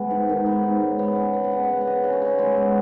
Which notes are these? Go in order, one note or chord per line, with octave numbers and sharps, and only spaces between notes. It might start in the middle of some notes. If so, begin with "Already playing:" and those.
Already playing: G#3 B3 F#5
G#2
D#3
B3
G#2
C#3
B3
C#3
B3
F#5
C#3 D#5
B3 F#5
F#5
B3 D#5
C#3
C#5
C#3
G#3 B4
B3